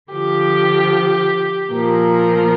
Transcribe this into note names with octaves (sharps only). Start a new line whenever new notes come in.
D3 F3 G4
A#2 F3 A#4